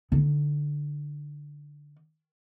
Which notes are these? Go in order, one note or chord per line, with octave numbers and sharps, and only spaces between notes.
D3 D#4